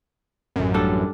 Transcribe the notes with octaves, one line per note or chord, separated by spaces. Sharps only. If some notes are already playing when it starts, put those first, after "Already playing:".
A1 F#2
G3 D4 A4